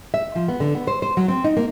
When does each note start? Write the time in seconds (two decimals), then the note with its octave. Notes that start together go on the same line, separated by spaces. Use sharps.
0.14 E5
0.35 F3
0.48 B3
0.60 D3
0.75 B3
0.87 C5
1.02 C5
1.17 F#3
1.28 C4
1.44 D#4
1.57 A#3